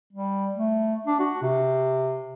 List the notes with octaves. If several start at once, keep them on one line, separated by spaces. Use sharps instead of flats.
G3
A3
D4
F#4
C3